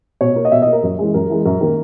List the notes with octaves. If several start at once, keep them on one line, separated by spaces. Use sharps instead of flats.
B2 C#5
A#3
D#5
B2 E5
A#3 D#5
A#4
F#2
E3 G#3
F#2 A#4
E3 G#3
F#2 A#4
D#3 A#3